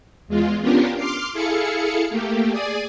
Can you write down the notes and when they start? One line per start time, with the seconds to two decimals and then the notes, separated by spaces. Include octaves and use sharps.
0.28 E2 G#3 F4
0.61 B3 C#4 D4 F4 G4 A#4
0.96 C6 D6 F6 C7
1.33 E4 G#4 A4 F5 C#7
2.10 A3 A#3 G4
2.50 G#4 D5 G#5